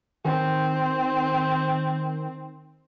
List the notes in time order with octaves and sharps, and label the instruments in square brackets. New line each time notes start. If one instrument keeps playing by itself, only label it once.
[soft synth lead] D#3 [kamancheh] C4